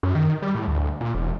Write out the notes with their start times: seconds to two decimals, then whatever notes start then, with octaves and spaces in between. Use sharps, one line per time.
0.03 F#2
0.15 D#3
0.42 G3
0.55 A2
0.68 D2
1.01 A#2
1.15 E1